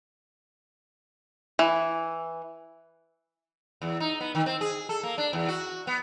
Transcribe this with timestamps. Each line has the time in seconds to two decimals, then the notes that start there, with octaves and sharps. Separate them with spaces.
1.59 E3
3.82 E2
4.00 D#4
4.20 B3
4.35 D#3
4.46 C4
4.61 G#4
4.89 A4
5.03 A#3
5.18 D4
5.33 E2
5.48 F#4
5.87 B3